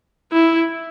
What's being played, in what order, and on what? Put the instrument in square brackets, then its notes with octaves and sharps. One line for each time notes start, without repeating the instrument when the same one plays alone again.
[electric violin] E4